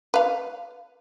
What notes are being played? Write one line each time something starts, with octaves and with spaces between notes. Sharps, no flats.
B4 F5